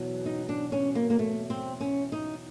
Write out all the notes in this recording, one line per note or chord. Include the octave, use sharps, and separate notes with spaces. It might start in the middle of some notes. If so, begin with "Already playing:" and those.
Already playing: E2 B2 F#3
D#4
D4
C#4
A#3
A#3
A3
C4
C#4
D#4